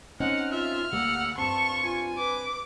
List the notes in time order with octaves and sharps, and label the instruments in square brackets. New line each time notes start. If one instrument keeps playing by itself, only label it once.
[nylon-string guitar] C4 C#4 D#4 [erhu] F#5 [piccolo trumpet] F6 [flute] F#6
[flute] F4 [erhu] E5 [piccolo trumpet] F6
[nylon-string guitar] D2 G3 A#3 [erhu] F#5 [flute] E6
[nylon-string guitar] G2 C4 [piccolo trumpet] F4 [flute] A5 [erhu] C#6
[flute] F4 [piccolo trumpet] G#5
[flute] B4 [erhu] D6